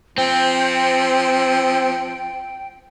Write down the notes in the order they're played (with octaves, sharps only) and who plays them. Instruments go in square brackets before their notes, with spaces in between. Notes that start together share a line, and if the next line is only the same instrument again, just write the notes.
[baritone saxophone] F3 [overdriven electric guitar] C4 [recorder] G5